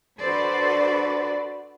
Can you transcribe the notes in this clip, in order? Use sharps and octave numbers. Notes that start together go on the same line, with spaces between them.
D4 F#4 A4 B4 C5 D5